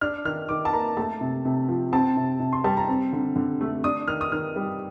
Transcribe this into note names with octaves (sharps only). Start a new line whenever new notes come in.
D4 F6
D#3 F6
D#3 D6
A5
A#3 A#5
A3 A5
C3
C3
F3
C4 A5
C3
C3
C6
G3 A5
A#5
C4
D3
D3
A3
D4 D#6
D#3 F6
D#6
D#3 F6
G3